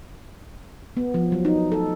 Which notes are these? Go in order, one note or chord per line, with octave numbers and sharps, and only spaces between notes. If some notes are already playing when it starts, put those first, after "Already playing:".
B3
F3
F#3
D#4
A4